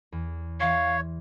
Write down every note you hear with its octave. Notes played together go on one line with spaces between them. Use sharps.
E2
E3 C#5 F5 C6